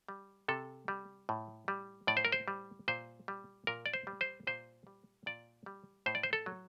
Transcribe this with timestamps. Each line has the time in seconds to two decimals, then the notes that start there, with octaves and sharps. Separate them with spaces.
0.08 G3
0.48 C3 A4
0.88 G3
1.29 A2
1.68 G3
2.07 A2 D5
2.17 C5
2.25 A#4
2.32 C5
2.48 G3
2.88 A#2 C5
3.28 G3
3.67 A#2 A#4
3.86 D5
3.94 C5
4.07 G3
4.21 C5
4.47 A#2 C5
4.87 G3
5.26 A#2 D5
5.66 G3
6.06 A2 C5
6.15 D5
6.23 C5
6.33 A4
6.46 F#3